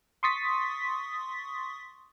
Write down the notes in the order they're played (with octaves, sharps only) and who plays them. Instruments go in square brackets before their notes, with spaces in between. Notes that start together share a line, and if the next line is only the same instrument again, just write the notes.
[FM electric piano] C6 C#6 D#6 A6 B6